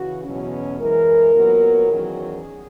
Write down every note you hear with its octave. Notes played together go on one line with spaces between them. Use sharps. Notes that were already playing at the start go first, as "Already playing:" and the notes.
Already playing: C#3 E3 F#4
E2 B2 F#3 C#4
F#2 E3 G#3 A#4
A#2 F#3 B3
E2 D#3 F#3 C#4 G#4